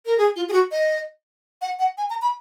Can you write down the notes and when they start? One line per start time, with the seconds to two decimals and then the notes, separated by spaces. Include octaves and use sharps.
0.06 A#4
0.18 G#4
0.36 F4
0.49 G#4
0.53 F#4
0.71 D#5
1.62 F#5
1.79 F#5
1.98 G#5
2.10 A#5
2.22 B5